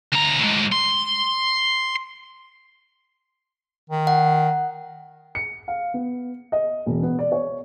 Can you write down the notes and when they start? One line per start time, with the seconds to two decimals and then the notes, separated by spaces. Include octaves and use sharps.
0.13 D2 A#5
0.40 A2 G#3
0.72 C6
3.90 D#3
4.07 F#5
5.35 C#7
5.68 F5
5.94 B3
6.52 D#5
6.86 E1
7.03 B3
7.19 D5
7.32 C#5